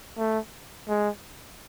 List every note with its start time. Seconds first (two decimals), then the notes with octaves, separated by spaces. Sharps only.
0.18 A3
0.88 G#3